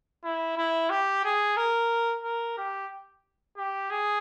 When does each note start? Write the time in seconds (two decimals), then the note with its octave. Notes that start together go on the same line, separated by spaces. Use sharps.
0.24 E4
0.57 E4
0.90 G4
1.24 G#4
1.57 A#4
2.24 A#4
2.57 G4
3.57 G4
3.90 G#4